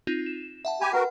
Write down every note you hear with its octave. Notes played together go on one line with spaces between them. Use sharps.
C4 D#4 F4
E7
E5 F#5 A5
G4 G5 G#5 B5 C6
F#4 A#4 B4 F#5